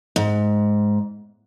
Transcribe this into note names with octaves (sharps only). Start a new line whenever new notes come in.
G#2